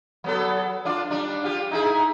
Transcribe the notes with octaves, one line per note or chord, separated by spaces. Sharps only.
F#3 B3 A4
D4 F4 D5
G3 D4
F4 G4
D#4 E4 G#4